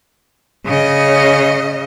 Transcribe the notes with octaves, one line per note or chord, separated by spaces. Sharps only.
C#3 D#5